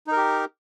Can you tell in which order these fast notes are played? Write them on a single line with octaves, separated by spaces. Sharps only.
D#4 A#4 G4